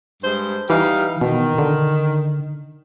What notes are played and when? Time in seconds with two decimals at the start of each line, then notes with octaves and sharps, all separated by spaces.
0.23 G2 G#3 C5
0.70 E3 G3 D#4 F5
1.21 B2 D#3
1.58 D3